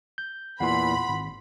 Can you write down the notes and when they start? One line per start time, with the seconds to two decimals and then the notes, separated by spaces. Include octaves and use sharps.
0.18 G6
0.60 E2 A#2 E3 F#5 B5 C6
1.08 G#1